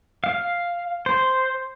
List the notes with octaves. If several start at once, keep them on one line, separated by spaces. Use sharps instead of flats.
F5
C5